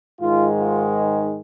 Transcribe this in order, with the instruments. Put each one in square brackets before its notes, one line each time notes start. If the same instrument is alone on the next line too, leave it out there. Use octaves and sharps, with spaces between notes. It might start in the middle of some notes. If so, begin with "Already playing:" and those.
[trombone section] G#2 D#3 G#3 F4
F4